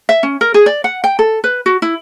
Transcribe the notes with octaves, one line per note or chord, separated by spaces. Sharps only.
E5
C#4
A#4
G#4
D5
F#5
G5
A4
B4
F#4
E4